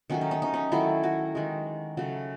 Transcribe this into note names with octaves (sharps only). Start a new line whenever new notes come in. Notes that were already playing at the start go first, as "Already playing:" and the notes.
D#3 F#3 A3 C#4
D#4
C#4
D#4
C#4
D#3 F#3 A3 E4
F#4
D#3 G#3
C#3 F#3 A3